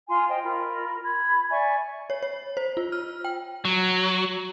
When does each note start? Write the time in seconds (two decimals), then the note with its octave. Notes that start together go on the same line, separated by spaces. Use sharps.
0.08 F4 G#5 C6
0.28 C5 D#5 G5
0.44 F4 A#4 B5
1.04 B5 G#6
1.51 D5 E5 G#5 C#6
2.10 C#5
2.23 C#5
2.57 C5
2.77 F4
2.92 F6
3.24 G5
3.65 F#3